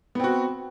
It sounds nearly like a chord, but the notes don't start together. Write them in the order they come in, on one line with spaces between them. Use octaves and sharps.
B3 C4 F#4